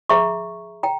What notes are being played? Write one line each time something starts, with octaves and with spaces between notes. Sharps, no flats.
G#4 E5 A#5 C#6
G5 A#5